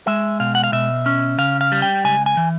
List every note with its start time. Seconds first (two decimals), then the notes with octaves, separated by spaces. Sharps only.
0.07 G#3 E5
0.40 B2 F5
0.55 F#5
0.64 F5
0.72 B2 E5
1.06 C#4
1.38 C#3 F5
1.61 F5
1.72 G3
1.82 G5
2.04 C#2 G#5
2.26 G#5
2.37 E3